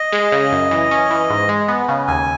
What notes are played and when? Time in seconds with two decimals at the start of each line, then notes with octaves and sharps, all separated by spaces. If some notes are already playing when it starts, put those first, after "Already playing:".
Already playing: D#5
0.13 G#3
0.32 C#3
0.52 F#2
0.71 E3
0.91 C#4
1.10 E3
1.30 G#2
1.49 G#3
1.68 B3
1.88 C#3
2.07 D#2 G#5